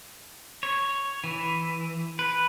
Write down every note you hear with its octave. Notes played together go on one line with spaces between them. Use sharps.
C#5
E3
B4